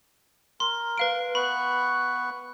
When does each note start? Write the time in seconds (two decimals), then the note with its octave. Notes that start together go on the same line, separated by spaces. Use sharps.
0.60 A#4 C6
0.98 B4 F5 D7
1.35 B3 B4 B5 C#6